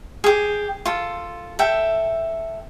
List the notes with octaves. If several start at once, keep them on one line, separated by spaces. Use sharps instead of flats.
G4 G#4
F4 A4
A4 E5 G5